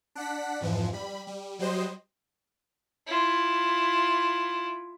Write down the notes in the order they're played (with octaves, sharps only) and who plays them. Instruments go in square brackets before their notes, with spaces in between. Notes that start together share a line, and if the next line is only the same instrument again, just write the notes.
[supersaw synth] D4 F#5 B6
F2 G#2 E3 F3
G3 B5
G3
F#3 G3 C5 D#5
[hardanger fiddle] E4 F4